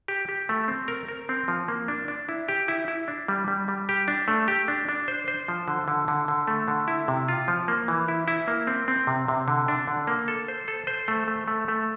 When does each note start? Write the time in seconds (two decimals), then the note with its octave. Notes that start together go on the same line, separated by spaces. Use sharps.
0.08 G4
0.29 G4
0.49 A3
0.68 C4
0.88 A#4
1.08 A#4
1.29 C4
1.48 F3
1.68 A#3
1.88 D4
2.08 D4
2.29 E4
2.49 G4
2.68 E4
2.88 E4
3.08 D4
3.28 G3
3.48 G3
3.68 G3
3.89 G4
4.08 D4
4.28 A3
4.48 G4
4.68 D4
4.89 D4
5.08 C5
5.28 C5
5.48 F3
5.68 D3
5.88 D3
6.08 D3
6.28 D3
6.48 A3
6.68 D3
6.88 E4
7.08 C3
7.28 F4
7.48 F3
7.68 A#3
7.88 E3
8.08 E4
8.28 E4
8.48 A#3
8.67 C4
8.88 C4
9.07 C3
9.28 C3
9.48 D3
9.68 D4
9.88 D3
10.07 A#3
10.28 A4
10.48 C5
10.68 A4
10.87 C5
11.08 A3
11.28 A3
11.48 A3
11.68 A3